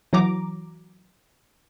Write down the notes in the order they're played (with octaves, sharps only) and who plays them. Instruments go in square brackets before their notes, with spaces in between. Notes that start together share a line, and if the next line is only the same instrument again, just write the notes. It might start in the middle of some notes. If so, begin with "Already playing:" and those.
[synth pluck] E3 F#3 A#5 D6